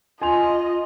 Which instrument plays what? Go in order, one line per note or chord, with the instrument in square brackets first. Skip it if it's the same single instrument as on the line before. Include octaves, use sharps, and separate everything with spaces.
[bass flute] F4 [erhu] D#5 [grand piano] G#5 C6 F7